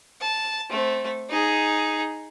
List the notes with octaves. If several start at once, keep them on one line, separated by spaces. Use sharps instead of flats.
A5
A3 C4
D#4 G#4